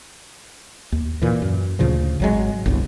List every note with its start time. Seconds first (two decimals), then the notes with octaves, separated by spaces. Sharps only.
0.92 D#2
1.22 A#2 E3
1.42 F#2
1.79 D2 A#2 C#3 F3
2.20 G#1 F#3 G#3
2.66 G1 C2